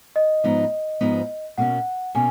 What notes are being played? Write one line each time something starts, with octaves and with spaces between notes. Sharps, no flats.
D#5
G#2 F3 B3 D#4
G#2 F3 B3 D#4
B2 A#3 C#4 F#5
B2 A#3 C#4 G#5